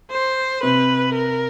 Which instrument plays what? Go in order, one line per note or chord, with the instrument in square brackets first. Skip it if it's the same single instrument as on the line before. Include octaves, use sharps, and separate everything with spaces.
[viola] C5
[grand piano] C3 [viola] B4
[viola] A#4